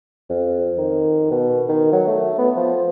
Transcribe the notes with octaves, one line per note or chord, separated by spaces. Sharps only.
F2
D#3
B2
D#3
F#3
A3
B3
F3